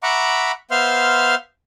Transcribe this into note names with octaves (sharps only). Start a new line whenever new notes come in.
E5 F#5 A#5 B5 C#6 D6
B3 C5 E5 F5 C6 F6